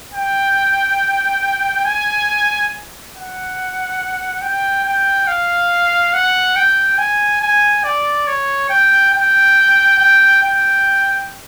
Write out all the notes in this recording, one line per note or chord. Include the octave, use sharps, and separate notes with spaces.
G5
G#5
F#5
G5
G5
F5
F#5
G5
G#5
G#5
D5
C#5
G5
G5
G5
G5